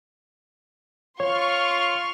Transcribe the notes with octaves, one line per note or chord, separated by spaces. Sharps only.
F4 C#5 C6 C#6 F6